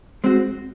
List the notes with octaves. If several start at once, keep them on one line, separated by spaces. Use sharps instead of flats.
G#3 C4 F#4